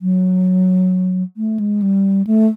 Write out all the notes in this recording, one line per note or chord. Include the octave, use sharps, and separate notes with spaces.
F#3
A3
G#3
G3
A3